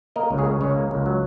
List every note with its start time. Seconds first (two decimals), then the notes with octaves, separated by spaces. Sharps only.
0.16 A#3 A#4 D#5
0.31 C#2
0.38 G#4 C#5
0.46 C#3
0.61 C#2 G#4 C#5
0.76 A#3
0.91 C#2
1.06 F#3